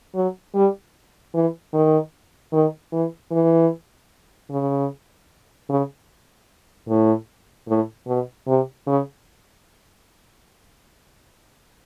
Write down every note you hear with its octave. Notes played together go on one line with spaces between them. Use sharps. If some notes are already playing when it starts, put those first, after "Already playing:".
F#3
G3
E3
D#3
D#3
E3
E3
C#3
C#3
A2
A2
B2
C3
C#3